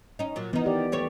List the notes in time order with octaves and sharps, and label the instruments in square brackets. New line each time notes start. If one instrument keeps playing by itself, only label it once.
[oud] C#4 D#4
A#2 F#3
[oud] D#3 D#4 [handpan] E3 B3
[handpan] G4 D5
[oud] D#2 A3 C#5